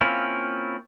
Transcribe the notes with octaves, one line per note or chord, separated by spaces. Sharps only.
A#3 C4 C#4 E4 F4